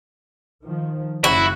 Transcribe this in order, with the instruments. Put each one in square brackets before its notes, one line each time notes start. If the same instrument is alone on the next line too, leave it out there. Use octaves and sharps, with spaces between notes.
[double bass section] D#3 F3
[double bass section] F#1 C#3 [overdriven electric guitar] E4 [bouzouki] F#4